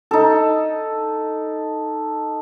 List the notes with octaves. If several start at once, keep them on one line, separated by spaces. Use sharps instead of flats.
D#4 A4